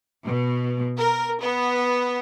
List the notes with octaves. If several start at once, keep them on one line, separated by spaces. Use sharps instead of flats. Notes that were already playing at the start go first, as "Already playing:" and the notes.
B2
A#4
B3